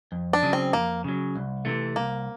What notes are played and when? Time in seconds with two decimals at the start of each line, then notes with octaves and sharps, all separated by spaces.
0.12 F2
0.33 D4
0.43 C#3 F#3
0.53 C4
0.73 F2 A#3
1.04 C#3 F#3
1.36 C2
1.65 C3 E3 A3
1.96 C2 A#3